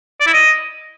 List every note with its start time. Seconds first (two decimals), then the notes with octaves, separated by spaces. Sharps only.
0.21 D5
0.27 E4
0.33 D#5